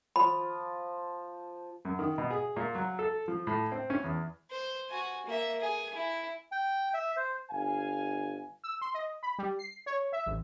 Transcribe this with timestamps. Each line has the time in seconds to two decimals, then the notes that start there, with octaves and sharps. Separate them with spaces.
0.16 F3 B5
1.85 F#2
1.99 D#3
2.18 B2
2.31 G#4
2.56 A#2
2.75 F#3
2.99 A4
3.28 F3
3.47 A2
3.72 C4
3.90 C#4
4.04 E2
4.51 C5
4.89 F#4 G#5
5.26 A#3 E5
5.61 G#4 G#5
5.95 E4
6.52 G5
6.94 E5
7.17 C5
7.51 G1 F5 G#5
8.64 E6
8.81 C6
8.94 D#5
9.23 B5
9.38 G3
9.59 C7
9.86 C#5
10.13 E5
10.26 A1